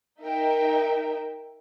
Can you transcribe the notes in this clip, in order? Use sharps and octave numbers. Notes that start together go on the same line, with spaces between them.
D#4 A#4 E5 G5